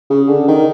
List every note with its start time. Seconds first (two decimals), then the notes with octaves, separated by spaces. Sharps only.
0.10 C#3
0.28 D3
0.48 D#3